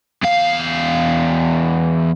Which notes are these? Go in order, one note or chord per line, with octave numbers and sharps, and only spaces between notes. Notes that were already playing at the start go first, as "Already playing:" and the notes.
E2 F5